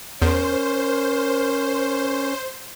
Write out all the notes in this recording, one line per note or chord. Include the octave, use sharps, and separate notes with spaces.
E2 C#4 A#4 C5